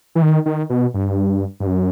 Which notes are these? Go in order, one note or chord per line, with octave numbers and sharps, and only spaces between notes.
E3
D#3
D#3
B2
G2
G2
F#2